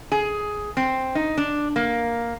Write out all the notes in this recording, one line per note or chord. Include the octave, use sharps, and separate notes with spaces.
G#4
C4
D#4
D4
A#3